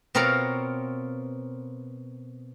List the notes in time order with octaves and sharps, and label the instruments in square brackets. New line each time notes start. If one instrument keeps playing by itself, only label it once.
[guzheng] B2 C4 F4 A#4 C#5 A#5